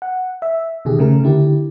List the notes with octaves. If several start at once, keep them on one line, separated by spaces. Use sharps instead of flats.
F#5
E5
B2 D#3 G4 G#4
C#3 A3 A#4
D3 E4 G4